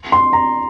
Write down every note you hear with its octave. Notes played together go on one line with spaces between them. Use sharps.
C6
A#5